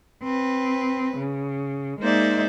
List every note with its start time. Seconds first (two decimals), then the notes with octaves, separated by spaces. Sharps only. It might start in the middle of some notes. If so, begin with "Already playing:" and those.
0.23 C4 B4
1.17 C#3
2.00 G#3 A#3 D#4 C5 D5 E5